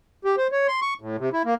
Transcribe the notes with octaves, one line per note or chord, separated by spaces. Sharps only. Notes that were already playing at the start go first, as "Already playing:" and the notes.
G4
C5
C#5
C6
C#6
A2
C3
E4
A#3